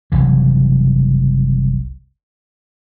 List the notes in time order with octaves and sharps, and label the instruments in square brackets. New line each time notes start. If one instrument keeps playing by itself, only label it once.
[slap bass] F#1 C2 E3